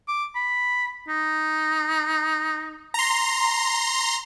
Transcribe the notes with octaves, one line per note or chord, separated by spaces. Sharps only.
D6
B5
D#4
A#5 C6